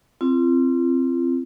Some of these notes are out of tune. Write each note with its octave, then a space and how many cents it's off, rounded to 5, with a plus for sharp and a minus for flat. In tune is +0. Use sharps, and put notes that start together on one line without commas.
C4 +5 F4 -40